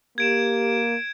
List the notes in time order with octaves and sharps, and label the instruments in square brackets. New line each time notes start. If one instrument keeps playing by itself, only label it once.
[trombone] A#3 [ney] G4 [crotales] G#6 D7 E7